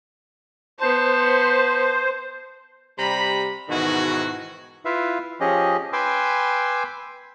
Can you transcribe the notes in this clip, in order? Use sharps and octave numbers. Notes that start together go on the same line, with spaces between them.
B3 C5 A5
C3 G3 A#5 B5
G#2 B2 D#3 E3 F#4
E4 F4 B4 E5 F5
F3 C#4 G4 G#4 D#5
B4 G5 G#5 C6 D6 E6